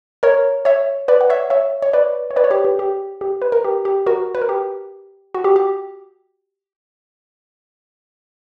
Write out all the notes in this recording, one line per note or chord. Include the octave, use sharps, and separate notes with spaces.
A#4 C#5
C#5 E5
B4 D5
F#5
C#5 E5
C#5 E5
C#5
B4 D5
C#5
B4 D5
C#5
G4 B4
G4
G4
G4
B4
A#4
G4
G4
F#4 A#4
B4
A#4
G4
F#4
G4
G4